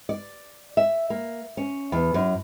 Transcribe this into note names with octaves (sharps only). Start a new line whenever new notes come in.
D5
E5
A#3
C#4
E2
F#2